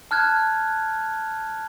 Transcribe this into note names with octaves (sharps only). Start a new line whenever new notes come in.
A5 F6 F#6 G#6